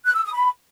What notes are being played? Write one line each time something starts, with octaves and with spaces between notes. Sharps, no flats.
F#6
E6
D#6
B5